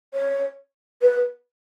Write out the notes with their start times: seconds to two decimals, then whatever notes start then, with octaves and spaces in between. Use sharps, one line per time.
0.14 C#5
1.02 B4